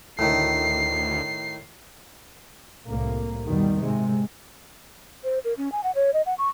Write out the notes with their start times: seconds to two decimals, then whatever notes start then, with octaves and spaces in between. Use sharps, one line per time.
0.19 D2 A2 D#3 C7
2.85 C2 A2 A#3
3.47 E2 B2 D#3 G3
3.78 G#2 C3 G#3
5.24 C5
5.44 A#4
5.57 C#4
5.72 G#5
5.83 F#5
5.95 C#5
6.13 D#5
6.26 F#5
6.38 C#6